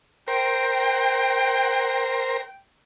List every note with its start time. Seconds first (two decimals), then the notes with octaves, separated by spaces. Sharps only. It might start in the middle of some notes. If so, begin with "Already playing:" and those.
0.28 A#4 C5 G5